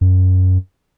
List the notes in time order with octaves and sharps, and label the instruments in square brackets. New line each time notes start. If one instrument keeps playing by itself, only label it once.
[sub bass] F#2